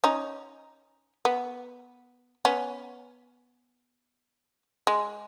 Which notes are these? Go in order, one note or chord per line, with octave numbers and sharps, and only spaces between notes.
C#4 D#4
B3
B3 C#4
G#3